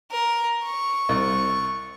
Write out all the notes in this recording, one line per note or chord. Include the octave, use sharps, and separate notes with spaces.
A#4
C#6
C2